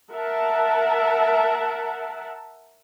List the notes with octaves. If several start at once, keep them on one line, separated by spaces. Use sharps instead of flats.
A#4 E5 F#5 A5